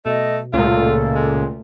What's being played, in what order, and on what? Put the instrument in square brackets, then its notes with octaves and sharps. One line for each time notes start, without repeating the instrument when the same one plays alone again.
[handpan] B2 [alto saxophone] A3 [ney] D#5
[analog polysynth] C#2 A#2 [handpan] A3 [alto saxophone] F4 [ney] A4
[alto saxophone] G#3